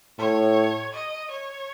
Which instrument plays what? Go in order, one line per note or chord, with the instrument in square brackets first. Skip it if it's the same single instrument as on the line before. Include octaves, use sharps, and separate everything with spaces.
[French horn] A2 [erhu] C#5
[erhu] D#5
C#5